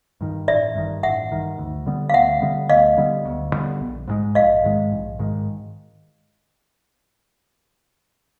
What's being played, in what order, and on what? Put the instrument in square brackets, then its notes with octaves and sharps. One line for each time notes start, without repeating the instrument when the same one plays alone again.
[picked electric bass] G2 D#3
[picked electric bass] A1 [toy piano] D5 E5
[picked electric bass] G2 D#3
[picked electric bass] A1 [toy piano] E5 F#5
[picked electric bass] G2 D#3
D2
D3 G3 B3
[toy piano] F5
[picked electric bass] D2 [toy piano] E5 F#5
[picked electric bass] D3 G3 B3
[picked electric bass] D2 [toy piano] D#5 F5
[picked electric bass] D3 G3 B3
D2
D3 G3 B3
A#1
G#2 D#3 G#3
[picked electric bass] A#1 [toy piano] D#5 F5
[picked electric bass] G#2 D#3 G#3
A#1
G#2 D#3 G#3